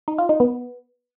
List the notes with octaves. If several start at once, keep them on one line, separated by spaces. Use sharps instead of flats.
D#4
F4
D#4
B3